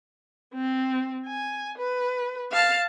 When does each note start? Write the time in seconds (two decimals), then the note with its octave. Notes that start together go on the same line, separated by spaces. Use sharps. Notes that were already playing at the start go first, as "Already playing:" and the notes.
0.54 C4
1.27 G#5
1.78 B4
2.51 F5 A5